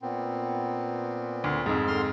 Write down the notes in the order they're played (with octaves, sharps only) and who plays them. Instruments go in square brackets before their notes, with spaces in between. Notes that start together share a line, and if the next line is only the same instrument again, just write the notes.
[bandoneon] A#2 B3 C4
[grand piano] D2
F2 G#2
[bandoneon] D3 C6 F6